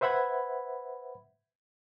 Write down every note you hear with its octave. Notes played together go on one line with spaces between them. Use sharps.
B4 C5 E5 F#5 B5 G#6